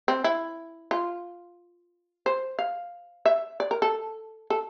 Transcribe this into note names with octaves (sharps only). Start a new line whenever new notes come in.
C4
E4
F4
C5
F5
E5
D5
A#4
A4
A4